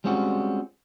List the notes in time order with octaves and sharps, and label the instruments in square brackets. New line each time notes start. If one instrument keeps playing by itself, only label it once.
[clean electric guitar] G3 G#3 C4 C#4 F4 F#4